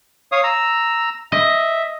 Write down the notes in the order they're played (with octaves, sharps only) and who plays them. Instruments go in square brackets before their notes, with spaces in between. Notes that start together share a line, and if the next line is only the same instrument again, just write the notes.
[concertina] C#5 F5 D#6
A#5 E6
[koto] D#5 [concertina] E5